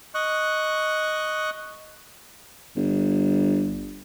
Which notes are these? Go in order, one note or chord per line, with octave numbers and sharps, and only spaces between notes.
D#5 C#6 F#6
G1